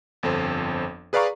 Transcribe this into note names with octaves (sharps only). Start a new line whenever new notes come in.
G1 F2 A4 C5
G#4 B4 D5 F5 A#5 C#6